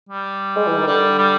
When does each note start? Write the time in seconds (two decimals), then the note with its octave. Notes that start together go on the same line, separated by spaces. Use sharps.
0.09 G3
0.56 G#3
0.67 E3
0.77 D#3
0.87 D3 G3
1.18 G3